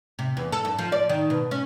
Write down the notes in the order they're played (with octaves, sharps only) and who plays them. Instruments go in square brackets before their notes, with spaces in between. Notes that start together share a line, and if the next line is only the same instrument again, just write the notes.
[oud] C3
E2
A4
F#2
F3
D5
D#3
B2
C#4